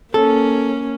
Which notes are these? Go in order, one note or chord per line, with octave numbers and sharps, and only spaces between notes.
A#3 C#4 A4